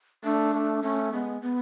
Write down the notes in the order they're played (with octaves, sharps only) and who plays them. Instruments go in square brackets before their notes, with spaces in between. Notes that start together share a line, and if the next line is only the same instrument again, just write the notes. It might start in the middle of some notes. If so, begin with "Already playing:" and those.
[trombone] A3 [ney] D4
[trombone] A3
[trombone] A3 [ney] C#4
[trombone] G#3 [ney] B3
[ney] B3